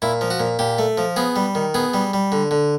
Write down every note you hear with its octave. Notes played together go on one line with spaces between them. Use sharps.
A#2 E4
F3
F#4
A#2
A#2 G4
A3
F3
B3 G#4
G3
D#3
B3 G#4
G3
G3
D3
D3